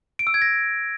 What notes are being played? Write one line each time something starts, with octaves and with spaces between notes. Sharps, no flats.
D7
E6
G#6
A#6